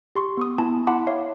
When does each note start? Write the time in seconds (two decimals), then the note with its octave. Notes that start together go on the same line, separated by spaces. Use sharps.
0.15 G4 C6 C#6
0.37 B3 C#6 D#6
0.58 B3 E4 G#5 A5
0.87 E4 F#5 A5 B5 C6 D6
1.07 C#5 E5 F5